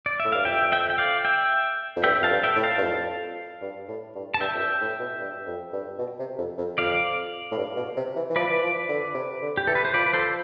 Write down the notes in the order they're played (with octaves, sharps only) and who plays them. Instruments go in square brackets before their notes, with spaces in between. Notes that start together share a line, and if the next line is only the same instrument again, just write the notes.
[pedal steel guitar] D5
E5
[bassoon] A2
[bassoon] G2 [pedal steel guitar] F5
[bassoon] F2 [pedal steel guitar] E5 G5
[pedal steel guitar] E5 G5
G5
D5 F5
E5 G5
[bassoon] F2
[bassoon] G2 [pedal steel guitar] E5 G5
[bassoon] F2 [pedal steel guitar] F5 A5
[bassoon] G2
[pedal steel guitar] E5 G5
[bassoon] A2
[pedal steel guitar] F5 A5
[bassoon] G2
F2
G2
A2
G2
[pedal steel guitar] A5
[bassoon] G2 [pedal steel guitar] E5 G5
[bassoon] F2
G2
A2
B2
G2
F2
G2
B2
C3
F2
F2
[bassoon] F2 [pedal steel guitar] D5 F5
[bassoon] A2
G2
B2
C3
E3
E3
[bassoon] F3 [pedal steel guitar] B4 D5
[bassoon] E3
F3
D3
C3
D3
[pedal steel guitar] G4
[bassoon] E3 [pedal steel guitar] A4
[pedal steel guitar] B4
C5
[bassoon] F3 [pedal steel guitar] B4 D5
[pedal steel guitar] B4
A4 C5